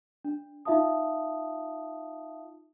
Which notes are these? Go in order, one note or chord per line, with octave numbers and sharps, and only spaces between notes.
D4
D#4 F4 E5 F5 A5 D#6